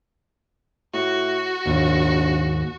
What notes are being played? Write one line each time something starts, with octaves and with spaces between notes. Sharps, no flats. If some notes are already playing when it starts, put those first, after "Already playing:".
A2 F#4
A#1 D#2 G#2